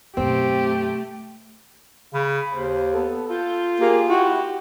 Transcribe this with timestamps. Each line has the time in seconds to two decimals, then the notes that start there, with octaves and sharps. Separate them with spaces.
0.17 F#2 B2 A3 C4 G4
2.13 C#3 B5
2.53 D#2 C5
2.93 B3 A4
3.30 F4 A4 G6
3.80 A#3 G4 G#4
4.09 E4 F#4 G4